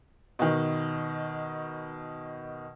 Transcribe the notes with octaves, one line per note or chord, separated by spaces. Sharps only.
B2 D#3